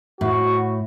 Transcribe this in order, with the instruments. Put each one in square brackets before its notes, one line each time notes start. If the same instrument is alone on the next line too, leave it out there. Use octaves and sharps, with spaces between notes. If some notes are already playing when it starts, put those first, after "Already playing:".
[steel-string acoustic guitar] A2 [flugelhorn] F#4